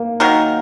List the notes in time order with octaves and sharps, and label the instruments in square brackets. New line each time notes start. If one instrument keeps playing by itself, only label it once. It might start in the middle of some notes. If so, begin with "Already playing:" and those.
Already playing: [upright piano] A#3
[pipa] D#3 F#3 D#4 A#4